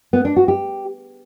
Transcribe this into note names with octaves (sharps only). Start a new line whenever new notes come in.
B3
D4
F#4
G4